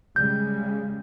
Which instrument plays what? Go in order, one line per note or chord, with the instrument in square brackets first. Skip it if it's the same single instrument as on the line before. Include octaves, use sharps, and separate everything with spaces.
[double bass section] C#3 G3 G#3 [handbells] G6